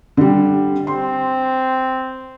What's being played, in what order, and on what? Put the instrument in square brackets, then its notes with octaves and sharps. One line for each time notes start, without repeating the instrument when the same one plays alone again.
[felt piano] D3 G3
[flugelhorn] C4 [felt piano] C6